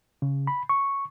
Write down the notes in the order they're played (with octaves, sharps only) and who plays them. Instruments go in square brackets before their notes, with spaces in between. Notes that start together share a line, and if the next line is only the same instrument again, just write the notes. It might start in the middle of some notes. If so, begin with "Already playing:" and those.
[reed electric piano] C#3
B5
C#6